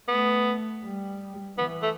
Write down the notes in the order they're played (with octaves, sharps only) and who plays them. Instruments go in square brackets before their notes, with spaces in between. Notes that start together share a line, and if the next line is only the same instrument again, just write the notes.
[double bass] A3 [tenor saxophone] B3
[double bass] G3
[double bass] E3 [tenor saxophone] B3
[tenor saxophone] A3